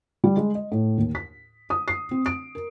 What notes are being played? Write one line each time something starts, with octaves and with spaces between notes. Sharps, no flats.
G3
G#3
D#5
A2
D#2
B6
D#6
C7
C4
D7
A#4